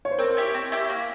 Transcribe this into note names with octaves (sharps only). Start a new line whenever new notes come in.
C#5
C5
C4 A#4
E4 G4 C#5
C4
E4 G4 C#5
A#3